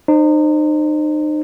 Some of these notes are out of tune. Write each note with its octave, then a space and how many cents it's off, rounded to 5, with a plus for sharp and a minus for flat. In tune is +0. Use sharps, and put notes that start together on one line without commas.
D#4 -35 C5 +10